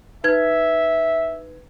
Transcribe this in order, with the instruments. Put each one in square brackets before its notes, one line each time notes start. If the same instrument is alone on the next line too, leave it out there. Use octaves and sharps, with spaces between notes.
[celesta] D#4 B4 G#6 [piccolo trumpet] E5